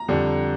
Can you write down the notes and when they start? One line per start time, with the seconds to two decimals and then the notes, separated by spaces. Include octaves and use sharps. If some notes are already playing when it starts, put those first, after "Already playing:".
Already playing: A#5
0.08 F2 D3 G3